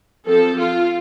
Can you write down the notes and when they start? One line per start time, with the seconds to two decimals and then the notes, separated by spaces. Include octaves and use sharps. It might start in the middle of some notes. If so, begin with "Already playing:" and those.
0.26 F3 C4 A4
0.59 F4